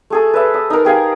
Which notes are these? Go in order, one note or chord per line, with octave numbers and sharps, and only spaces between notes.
A3 G#4 A4
B4 E5
D#6
D#4 A#4
G4 G#4 F5